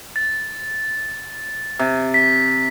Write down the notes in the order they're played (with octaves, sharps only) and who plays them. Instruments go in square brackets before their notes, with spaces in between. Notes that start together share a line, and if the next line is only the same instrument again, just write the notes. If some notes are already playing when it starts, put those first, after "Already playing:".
[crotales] A6
[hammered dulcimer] C3
[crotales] B6